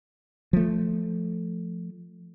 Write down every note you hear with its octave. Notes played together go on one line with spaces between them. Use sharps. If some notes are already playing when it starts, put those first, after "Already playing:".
F3 A3